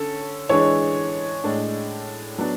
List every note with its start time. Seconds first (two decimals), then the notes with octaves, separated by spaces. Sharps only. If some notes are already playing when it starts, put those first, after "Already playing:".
Already playing: D3 C#4 A4
0.49 E3 G#3 D4 C#5
1.44 A2 G#3 D4
2.38 F#3 B3 D4